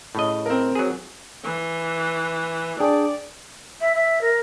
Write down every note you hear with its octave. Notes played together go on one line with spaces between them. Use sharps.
A2 C#3 D#5
C4 A#4
F#3 G#4
E3
D4 G#4 D5 G5
E5
E5
A#4